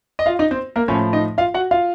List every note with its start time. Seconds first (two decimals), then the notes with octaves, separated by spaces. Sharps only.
0.19 D#5
0.26 F4 F5
0.39 D#4 D#5
0.51 C4 C5
0.76 A#3 A#4
0.88 A2 F3 C#4 C#5
1.13 D#4 D#5
1.38 F4 F5
1.54 F#4 F#5
1.71 F4 F5